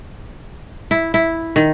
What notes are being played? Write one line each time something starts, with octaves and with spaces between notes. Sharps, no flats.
E4
E4
D#3